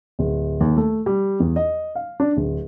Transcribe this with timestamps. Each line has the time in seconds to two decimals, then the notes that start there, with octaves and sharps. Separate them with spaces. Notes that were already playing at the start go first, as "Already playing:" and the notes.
0.19 D1
0.61 D#2
0.77 A3
1.06 G3
1.40 E2
1.56 D#5
1.95 F5
2.20 D4
2.37 D1